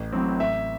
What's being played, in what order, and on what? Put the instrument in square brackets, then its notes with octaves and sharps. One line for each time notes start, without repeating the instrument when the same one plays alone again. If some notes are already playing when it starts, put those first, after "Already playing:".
Already playing: [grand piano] A1
A2 F#3 C4
A1 E5